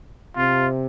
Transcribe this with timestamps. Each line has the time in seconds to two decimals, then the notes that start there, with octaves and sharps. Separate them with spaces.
0.36 C3 F4